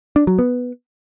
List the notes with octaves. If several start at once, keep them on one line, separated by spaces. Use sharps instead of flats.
D4
F#3
B3